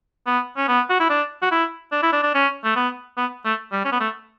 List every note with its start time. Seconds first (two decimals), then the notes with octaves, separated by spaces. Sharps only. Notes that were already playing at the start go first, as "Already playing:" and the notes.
0.26 B3
0.56 C#4
0.68 B3
0.90 F#4
1.00 E4
1.09 D4
1.42 F#4
1.51 E4
1.92 D4
2.02 E4
2.12 D4
2.23 D4
2.34 C#4
2.64 A3
2.76 B3
3.17 B3
3.45 A3
3.72 G3
3.85 C#4
3.92 B3
4.00 A3